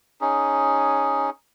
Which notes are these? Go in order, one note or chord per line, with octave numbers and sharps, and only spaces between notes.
C#4 D#4 G#4